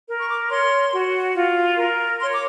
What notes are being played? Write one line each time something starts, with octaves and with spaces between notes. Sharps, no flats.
A#4
C#6
D6
C#5 C6
F#4
F4
A#4
C#5 C6
D6